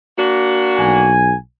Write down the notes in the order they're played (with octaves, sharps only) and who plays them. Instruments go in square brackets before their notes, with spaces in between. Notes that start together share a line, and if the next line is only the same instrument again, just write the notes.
[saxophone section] A#3 D4 F#4
[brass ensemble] B1 G#5